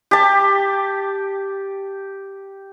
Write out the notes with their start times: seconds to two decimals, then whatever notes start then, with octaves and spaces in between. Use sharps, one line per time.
0.11 G4 A5